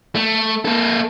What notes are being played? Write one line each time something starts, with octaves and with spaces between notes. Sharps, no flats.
A3
A#3 A4